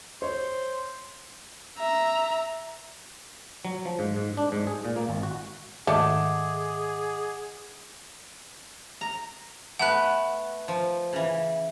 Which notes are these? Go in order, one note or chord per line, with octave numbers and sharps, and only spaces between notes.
C5 C#5
E5 A#5
F#3
F3
G#2
G#2
D4
G#2
G#4
A#2
A#3
G#1
F#4
G#2 D#3 A3 G#4 D#5 F#5 D6
A#5
A3 B3 B4 F#5 F#6
F3
C#3 E3